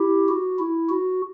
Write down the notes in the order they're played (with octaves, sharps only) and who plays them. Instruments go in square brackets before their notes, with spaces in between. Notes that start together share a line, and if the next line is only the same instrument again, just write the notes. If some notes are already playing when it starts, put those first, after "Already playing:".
Already playing: [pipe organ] E4 G4
F#4
E4
F#4